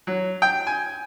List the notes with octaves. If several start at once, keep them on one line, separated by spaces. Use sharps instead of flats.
F#3
G5
G#5